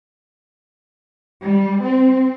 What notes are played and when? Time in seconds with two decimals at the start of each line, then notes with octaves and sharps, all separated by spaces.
1.42 G3
1.85 C4